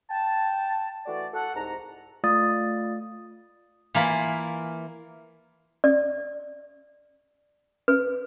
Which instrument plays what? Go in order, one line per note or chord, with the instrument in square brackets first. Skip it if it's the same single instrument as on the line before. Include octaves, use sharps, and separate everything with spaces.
[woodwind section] G5 A5
E3 A3 F#4 D5
F#4 A4 F#5
C2 G#2 A#5
[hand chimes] A3 F4 D5 F5 D#6 A6
[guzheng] E3 A#3 F4 B5
[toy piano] D5
B4